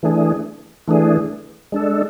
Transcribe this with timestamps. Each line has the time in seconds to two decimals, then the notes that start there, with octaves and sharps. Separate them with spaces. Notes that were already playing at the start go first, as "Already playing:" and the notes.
0.03 E3 A3 D4 G#4
0.88 E3 A3 D4 G#4
1.72 G#3 D4 A4